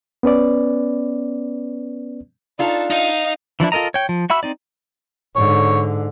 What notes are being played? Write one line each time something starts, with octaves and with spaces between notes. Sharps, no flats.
B3 C#4 B4 D5
D4 D#4 F4 A4 A5
D#4 D#5 F5
E3 F3 D4 E4
F4 A4 A#4 D#5 A#5
C#5 G5
F3
F#4 E5 B5 E6
C4 D#4 D5
G#2 D3 C#5